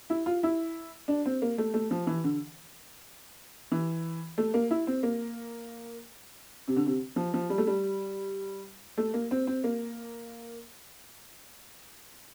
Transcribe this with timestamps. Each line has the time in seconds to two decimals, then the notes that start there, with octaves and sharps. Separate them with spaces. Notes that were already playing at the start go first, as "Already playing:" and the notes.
0.10 E4
0.26 F4
0.43 E4
1.08 D4
1.26 C4
1.42 A#3
1.58 A3
1.74 A3
1.91 F3
2.07 E3
2.24 D3
3.71 E3
4.38 A3
4.54 A#3
4.71 E4
4.87 C4
5.03 A#3
6.68 C3
6.76 D3
6.86 C3
7.16 F3
7.34 F3
7.50 G3
7.58 A3
7.67 G3
8.97 A3
9.14 A#3
9.31 C4
9.47 C4
9.64 A#3